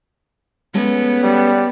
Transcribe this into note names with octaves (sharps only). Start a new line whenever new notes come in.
G#3 A3 B3 C#4
G3